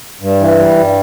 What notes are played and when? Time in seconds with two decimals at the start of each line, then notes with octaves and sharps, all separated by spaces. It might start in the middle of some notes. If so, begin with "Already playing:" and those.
0.21 G2
0.40 E3
0.59 G3
0.77 G2